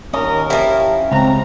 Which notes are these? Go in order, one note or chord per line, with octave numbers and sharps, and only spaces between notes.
D#2 C#4 A#4 D#5
F3 E4 G4
C#2 C4 A#5